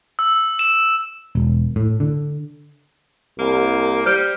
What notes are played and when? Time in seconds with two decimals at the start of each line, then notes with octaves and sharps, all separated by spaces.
0.19 E6
0.59 E7
1.35 E1
1.76 A2
2.00 D3
3.39 C2 A#3
4.06 G3 C5 F6 G6 D7